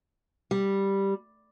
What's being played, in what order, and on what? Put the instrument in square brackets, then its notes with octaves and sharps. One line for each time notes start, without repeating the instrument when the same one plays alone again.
[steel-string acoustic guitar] G3